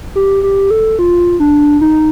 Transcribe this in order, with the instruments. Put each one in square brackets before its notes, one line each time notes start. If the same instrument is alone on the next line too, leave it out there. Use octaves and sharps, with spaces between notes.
[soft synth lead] G4
G4
A4
F4
D4
D#4